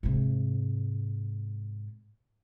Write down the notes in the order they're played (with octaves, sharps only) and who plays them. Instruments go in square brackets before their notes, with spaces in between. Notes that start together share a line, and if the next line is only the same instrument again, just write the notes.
[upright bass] G#2 C3